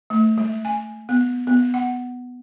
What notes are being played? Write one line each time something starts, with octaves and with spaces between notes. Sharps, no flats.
A3
G#3
G#5
B3
B3
F#5